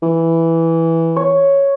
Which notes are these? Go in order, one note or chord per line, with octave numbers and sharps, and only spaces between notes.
E3
C#5